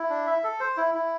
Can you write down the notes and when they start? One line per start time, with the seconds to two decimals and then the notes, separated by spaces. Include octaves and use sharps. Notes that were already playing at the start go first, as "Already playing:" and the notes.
Already playing: E4
0.09 D4
0.27 E5
0.44 A4
0.60 C5
0.77 E4
0.94 E4